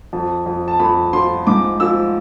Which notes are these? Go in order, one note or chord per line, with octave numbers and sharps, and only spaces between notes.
F2 A5
F2
A5
F2 B5
F3 C6
G#2 D6
F3 E6